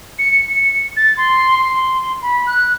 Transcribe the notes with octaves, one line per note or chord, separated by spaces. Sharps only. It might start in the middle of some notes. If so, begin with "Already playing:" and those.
C#7
C#7
A6
C6
C6
B5
F#6